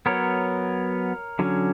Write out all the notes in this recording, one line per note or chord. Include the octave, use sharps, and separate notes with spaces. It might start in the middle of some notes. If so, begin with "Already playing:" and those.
F#3 B3 A#4 C#5
D3 F#3 C#4